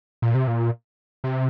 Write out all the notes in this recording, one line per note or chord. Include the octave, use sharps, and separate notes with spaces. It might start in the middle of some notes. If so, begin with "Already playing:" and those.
A#2
C3
A#2
C3